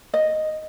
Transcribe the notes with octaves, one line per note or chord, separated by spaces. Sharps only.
D#5